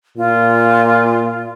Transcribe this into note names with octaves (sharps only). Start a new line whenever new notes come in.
A#2 F4